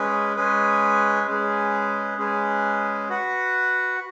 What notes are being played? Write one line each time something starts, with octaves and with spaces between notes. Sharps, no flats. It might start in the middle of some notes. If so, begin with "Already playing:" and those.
Already playing: G#3 C#4 G#4 B4
G#3 C#4 G#4 B4
G#3 C#4 G#4 B4
G#3 C#4 G#4 B4
F#4 B4 F#5